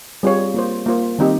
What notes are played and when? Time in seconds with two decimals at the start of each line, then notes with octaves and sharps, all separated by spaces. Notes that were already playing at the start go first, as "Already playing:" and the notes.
0.23 G3 C4 F4 G#4 C#5
0.54 A#3 F4 C5
0.86 A#3 F4 C5
1.19 D#3 G3 C4 D#4 G4